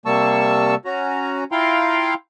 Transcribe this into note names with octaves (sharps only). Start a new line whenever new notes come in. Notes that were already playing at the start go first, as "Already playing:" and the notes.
C3 G3 A#3 A5 C#6 E6
C#4 F#4 A#5
E4 F4 F5 G5 A#5 C6